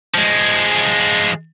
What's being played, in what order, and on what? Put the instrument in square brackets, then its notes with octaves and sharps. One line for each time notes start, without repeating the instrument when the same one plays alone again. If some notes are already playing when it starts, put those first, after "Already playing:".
[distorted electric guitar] F3 G#3